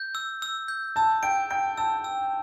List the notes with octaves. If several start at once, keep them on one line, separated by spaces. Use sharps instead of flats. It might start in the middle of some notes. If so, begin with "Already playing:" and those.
Already playing: G6
E6
E6
G6
A5 E6
G5 D7
G5 D7
A5 E6
E6